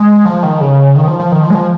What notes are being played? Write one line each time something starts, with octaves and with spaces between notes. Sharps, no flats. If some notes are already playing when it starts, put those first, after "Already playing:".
Already playing: G#3
F3
D#3
C#3
D#3
F3
F3
D#3
F3
G#3
F3